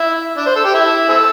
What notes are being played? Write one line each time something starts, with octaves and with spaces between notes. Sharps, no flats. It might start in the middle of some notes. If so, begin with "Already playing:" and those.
Already playing: E4
D4
C5
A4
G4
E4
C4 E4 A4